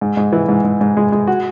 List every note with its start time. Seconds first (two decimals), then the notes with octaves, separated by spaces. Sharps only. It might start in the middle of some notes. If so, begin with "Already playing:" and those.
0.01 G#2
0.17 G#2
0.32 E3
0.49 G#2
0.64 G#2
0.81 G#2
0.97 G#3
1.12 G#3
1.27 F#4